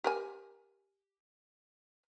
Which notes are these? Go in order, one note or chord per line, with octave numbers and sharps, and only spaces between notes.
G4 A#4 G#5